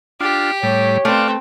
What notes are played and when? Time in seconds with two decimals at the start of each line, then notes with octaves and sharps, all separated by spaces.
0.21 D4 F4 G4
0.63 A2 G3 C#5
1.05 A3 C4 B4 D5 F5